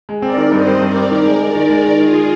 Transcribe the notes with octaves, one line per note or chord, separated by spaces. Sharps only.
G#3
C4 A#4 D5
D#3
G2 C5 D#5
C4
G2 A#4 D5
C4
D#3 A#4 D5
G#3
G#3 A#4 D5
D#3
G#3 A#4 D5
D#3
D#3 F4 G#4
G#3